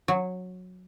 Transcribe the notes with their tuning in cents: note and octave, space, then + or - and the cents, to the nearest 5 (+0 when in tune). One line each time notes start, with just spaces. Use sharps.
F#3 -15